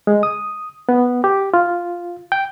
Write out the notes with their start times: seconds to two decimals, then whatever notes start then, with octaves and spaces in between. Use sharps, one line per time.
0.07 G#3
0.23 D#6
0.89 B3
1.24 G4
1.54 F4
2.32 G5